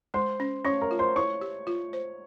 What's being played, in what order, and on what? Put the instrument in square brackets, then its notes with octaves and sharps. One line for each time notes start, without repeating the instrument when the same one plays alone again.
[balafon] G#3 [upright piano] C5 C6
[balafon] C#4
[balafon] C#4 [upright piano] C#5 C#6
[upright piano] A#4 A#5
[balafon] F4
[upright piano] C5 C6
[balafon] E4 [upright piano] C#5 C#6
[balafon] G4
F4
C5